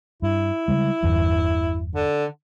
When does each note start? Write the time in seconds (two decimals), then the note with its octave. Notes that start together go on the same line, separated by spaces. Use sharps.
0.22 G2 E4
0.68 C#3 G3 G#3
1.03 G1 E2 G2
1.95 D3